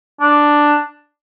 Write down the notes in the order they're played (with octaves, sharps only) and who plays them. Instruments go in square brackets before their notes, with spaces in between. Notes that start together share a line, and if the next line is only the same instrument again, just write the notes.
[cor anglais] D4